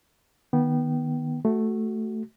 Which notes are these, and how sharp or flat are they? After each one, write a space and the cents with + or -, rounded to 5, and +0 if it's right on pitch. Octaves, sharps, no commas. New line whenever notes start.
D#3 -15 B3 -20 G5 -20
A3 +0 F#4 +15